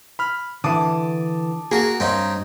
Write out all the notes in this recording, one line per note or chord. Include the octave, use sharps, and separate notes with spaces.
B5 F6
D3 E3 A5 D6 D#6
A#3 F#4 G#4
G2 C4 C#4 D#4